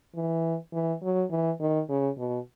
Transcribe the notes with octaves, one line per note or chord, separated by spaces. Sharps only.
E3
E3
F#3
E3
D#3
C#3
B2